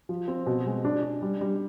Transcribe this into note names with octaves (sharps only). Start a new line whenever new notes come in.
F3
C4
B2
G#3
D4
D4
G3
G3